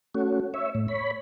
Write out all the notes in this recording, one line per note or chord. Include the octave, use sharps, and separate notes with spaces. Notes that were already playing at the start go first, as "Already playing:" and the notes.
A3 C#4 F#4
C#5 E5
A2
C#5 B5